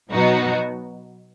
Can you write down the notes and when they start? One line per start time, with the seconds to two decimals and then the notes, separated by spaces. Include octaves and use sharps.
0.12 B2 F#3 B3 D#4 F#4